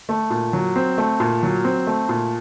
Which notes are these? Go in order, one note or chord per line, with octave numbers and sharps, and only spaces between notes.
A3
A#2
F#3
C4
A3
A#2
F#3
C4
A3
A#2